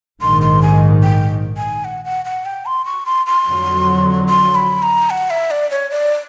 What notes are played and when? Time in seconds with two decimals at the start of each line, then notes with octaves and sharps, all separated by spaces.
0.22 A#1 G#2 D#3 C6
0.42 C6
0.62 G#5
1.03 G5
1.57 G#5
1.85 F#5
2.05 F#5
2.25 F#5
2.45 G5
2.66 C6
2.86 C#6
3.06 C6
3.26 C6
3.47 F2 D3 F#3
4.29 C6
4.55 B5
4.83 A#5
5.10 F#5
5.30 E5
5.51 D5
5.71 C#5
5.91 D5